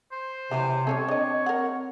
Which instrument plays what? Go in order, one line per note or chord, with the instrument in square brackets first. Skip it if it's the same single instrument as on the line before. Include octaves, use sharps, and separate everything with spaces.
[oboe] C5
[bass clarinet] C3 [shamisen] E3 F#3 C#4
[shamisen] G3 C#4 A4 [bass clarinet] C4 [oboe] C#5
[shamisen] D4 D#5
A#4 F#5